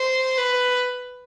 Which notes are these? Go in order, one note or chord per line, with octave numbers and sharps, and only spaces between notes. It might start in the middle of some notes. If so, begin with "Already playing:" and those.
Already playing: C5
B4